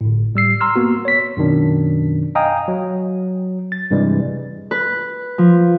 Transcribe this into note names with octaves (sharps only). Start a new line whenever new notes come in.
G1 A2
A2 G3 E6 C7
A#5 C6 E6 F6
A#3 B3 F#4
C#5 B6
F#2 B2 D#3 D4
D#5 F5 G5 G#5 A#5 D#6
F#3
A6
G2 C3 E3 G3 G#3
B4
F3